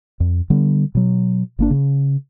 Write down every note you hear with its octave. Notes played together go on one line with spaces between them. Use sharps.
F2
D3 G3 B3
B2 F#3
G1 A#3 D4
C#3